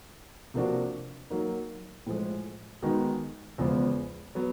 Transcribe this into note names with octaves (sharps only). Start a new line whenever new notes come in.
C3 F3 A#3 D4 F#4
F#3 A#3 D#4
A2 F3 G#3
D#3 G#3 B3 D#4 F#4
E2 C#3 F3 G#3 B3
F#3 B3